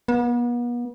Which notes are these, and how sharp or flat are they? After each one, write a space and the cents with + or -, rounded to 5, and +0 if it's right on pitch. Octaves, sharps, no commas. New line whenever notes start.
B3 -40